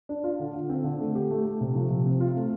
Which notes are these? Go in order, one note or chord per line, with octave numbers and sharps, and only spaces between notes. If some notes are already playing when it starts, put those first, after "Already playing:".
D4
F4
D3
D3
C4
D3
A3
G4
A3
A3
C3
F3
C3
C4
F4
A3